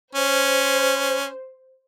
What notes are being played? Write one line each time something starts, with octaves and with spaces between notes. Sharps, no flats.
C#4 C5